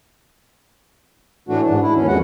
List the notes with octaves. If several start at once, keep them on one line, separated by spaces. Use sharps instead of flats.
A2 E3 A3 D4 F#4
G#2 D4
E4
D#2 E3 C#4
F2 G#3 F#4 F#5